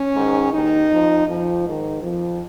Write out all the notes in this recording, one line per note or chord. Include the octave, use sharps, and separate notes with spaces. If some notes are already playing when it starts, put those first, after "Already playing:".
Already playing: C#4
G#2 D#3
D#2 D#3 D#4
F2 F3
F2 F3
G#2 D#3
F2 F3